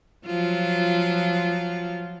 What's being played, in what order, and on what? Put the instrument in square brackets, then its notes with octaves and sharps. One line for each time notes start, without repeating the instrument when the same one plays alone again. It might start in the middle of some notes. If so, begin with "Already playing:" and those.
[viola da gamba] F3 F#3 F4